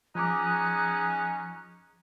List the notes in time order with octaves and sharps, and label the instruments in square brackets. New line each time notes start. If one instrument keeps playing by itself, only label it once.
[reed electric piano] F3 A#5 D6 [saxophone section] C#4 D#4 G#4 [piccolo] F#6